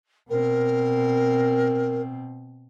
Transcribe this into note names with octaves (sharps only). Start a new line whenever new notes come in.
B2 C4 A#4